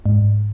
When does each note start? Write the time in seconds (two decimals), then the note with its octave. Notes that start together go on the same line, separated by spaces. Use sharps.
0.06 G#2